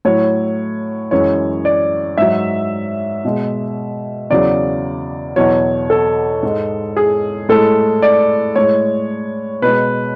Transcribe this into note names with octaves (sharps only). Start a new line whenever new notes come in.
A2 F#3 C#5
F#2 E3 G#3 C#5
D5
G#2 F#3 E5
B2 G#3
E2 C#3 F#3 D5
E2 B2 F#3 C#5
A4
G#2 G#3
G#4
A2 G#3 A4
D5
A2 G#3 C#5
B2 G#3 B4